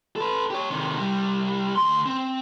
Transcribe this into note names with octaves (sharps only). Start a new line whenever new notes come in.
A4 B4
G4 C#5
C3 D#3
C2 G3
D2 C6
C4